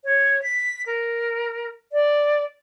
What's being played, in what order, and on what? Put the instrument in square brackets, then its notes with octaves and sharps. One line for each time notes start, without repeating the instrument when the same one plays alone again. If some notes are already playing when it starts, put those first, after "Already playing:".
[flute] C#5
B6
A#4
D5